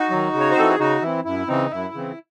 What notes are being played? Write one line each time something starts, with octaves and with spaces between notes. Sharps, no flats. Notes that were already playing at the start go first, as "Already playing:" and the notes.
Already playing: D#4 F#4
D#3 F#3
C#3
C#5
C5
E3 C4 A4
G#4
C#3 D#4 F#4
E3 C4 E4
F#2 E4
C#3 E3 C4 D#4
F#2 E4
C#3 E3 C4